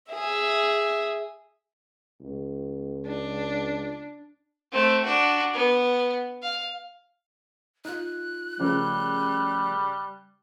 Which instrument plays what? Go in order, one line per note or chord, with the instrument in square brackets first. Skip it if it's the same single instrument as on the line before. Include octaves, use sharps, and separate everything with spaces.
[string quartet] G#4 E5
[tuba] C#2
[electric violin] D4
[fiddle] A3 C4
D4 F#4
B3
F5
[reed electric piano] D#4 F4 [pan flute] F#6
[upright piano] C#3 [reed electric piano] F3 A3 A#4 [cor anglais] G3